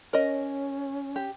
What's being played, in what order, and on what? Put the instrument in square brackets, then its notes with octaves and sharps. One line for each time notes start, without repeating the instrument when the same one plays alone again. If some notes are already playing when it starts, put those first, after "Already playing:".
[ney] C#4 [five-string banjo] A#4 D#5 [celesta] C#5
[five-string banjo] G4